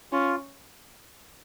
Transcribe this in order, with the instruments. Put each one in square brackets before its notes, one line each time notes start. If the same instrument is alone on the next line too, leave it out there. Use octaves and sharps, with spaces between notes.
[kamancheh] C#4 [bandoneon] F4